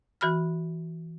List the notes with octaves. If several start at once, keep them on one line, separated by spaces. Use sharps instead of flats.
E3 F#4 B5 F6